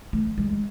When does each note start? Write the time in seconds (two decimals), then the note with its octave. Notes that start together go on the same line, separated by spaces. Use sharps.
0.13 A3
0.38 G#3